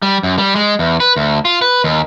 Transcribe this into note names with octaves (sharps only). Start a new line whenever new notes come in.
G3
F#2
G3
G#3
E2
B4
D2
F4
B4
D#2